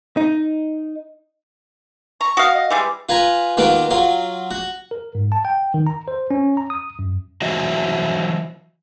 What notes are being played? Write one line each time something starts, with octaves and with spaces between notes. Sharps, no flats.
D#4
A#5 C#6
F#4 F5 D#6
D#5
E3 G3 G#3 D6
F4 B4 G#5 A#5
D#2 B3 F4 F#4 D6
F#3 F4
F#4
A#4
G#2
A5
G5
D#3
A#5
C5
C#4
A#5
D#6
F#2
E3 F#3 F#4 C5 D#5 E5